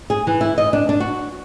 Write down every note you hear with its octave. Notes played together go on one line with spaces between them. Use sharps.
G#4
E3
E4
D#5
D4
D4
F#4